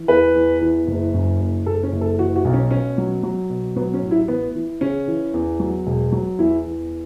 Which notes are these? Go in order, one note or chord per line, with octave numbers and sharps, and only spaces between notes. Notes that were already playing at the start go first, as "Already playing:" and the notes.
Already playing: E3
E2 B4
E2
E3
F#1
F#2
F#1
F#1 A4
C#4
F#1
A4
E3 F#4
F#4
B1
C#4
B2 C#4
F#3
F#3
B2
F#3 B3
C#4
A1
E4
E3 B3
E3
C#3 C#4
E3
E2
F#3
E1
F#3
E2 E4
E2